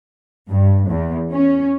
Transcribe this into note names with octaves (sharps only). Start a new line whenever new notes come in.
G2
E2
C#4